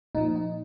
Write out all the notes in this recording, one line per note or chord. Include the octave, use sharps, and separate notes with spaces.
A#2 F3 D#4
D#4